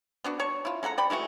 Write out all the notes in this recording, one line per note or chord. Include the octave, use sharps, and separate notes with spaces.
B3 D4 F#4
C#5 A5 C#6
E4 F4
G#3 A4 F#5 A#5
D5 G5 B5
E3 G#3 A3 F#4